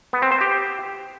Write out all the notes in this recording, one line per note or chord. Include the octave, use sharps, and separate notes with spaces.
B3
C4
C5
G4